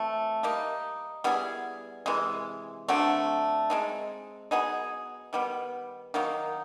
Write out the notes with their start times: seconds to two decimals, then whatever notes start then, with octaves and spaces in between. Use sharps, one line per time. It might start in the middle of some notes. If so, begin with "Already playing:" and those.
Already playing: E3 A3 C4
0.43 G3 A#3 D#4
1.24 G3 B3 E4 G#4
2.06 C3 E3 G#3
2.88 D3 F#3 A3 C4
3.70 G#3 C4 D#4
4.51 F#3 B3 D#4 G#4
5.33 D#3 G3 B3
6.14 D#3 F#3 A#3 D#4